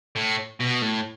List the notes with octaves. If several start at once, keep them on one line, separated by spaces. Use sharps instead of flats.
A2
B2
A2